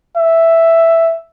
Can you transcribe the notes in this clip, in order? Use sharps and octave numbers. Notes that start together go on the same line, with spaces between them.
E5